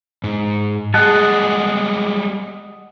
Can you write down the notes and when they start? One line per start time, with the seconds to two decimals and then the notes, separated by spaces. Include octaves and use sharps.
0.24 G#2
0.94 G3 G#3 G#4 D#5 F#5 A5